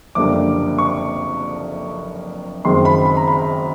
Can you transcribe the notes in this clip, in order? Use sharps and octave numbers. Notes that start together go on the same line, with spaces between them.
F#1 F2 D3 G3 A#3 D6
C#6
F#1 F#2 D#3 G#3 C4 C6
B5
B5
A#5
B5